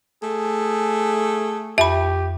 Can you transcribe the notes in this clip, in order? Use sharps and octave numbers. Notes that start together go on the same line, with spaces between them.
A3 G#4
F2 G4 E5 B5